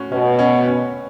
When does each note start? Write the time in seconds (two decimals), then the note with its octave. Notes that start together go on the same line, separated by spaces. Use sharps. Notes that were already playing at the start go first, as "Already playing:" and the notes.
Already playing: A2 C#4 F#4
0.11 B2 C#4
0.39 C#4
0.67 C#4